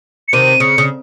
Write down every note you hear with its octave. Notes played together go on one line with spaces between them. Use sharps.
C#7
C3 D#3 D#7
C#3 C#7
C#3